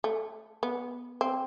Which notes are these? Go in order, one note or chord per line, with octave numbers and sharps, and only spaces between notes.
A3
B3
C4